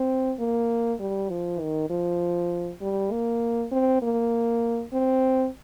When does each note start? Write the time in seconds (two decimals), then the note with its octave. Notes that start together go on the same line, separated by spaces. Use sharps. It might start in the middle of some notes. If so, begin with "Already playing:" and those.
Already playing: C4
0.39 A#3
1.00 G3
1.30 F3
1.60 D#3
1.90 F3
2.81 G3
3.12 A#3
3.72 C4
4.02 A#3
4.93 C4